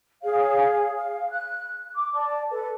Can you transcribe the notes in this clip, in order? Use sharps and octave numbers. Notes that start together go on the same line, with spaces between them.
G#4 C#5 F5
F5
F#6
D6
D5 A5
A4 B4